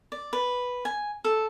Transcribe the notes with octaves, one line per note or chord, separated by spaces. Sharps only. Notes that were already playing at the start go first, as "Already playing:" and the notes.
D5
B4
G#5
A4